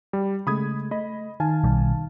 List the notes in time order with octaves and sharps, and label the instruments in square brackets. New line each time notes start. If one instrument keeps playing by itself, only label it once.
[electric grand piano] G3
[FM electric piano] C#3 G#3 A3 [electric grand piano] B5 D#6 G#6
[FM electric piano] A3 B5 [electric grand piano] D#5
[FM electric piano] D#3 F5 A5 [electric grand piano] G#5
[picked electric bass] B1 B2 G3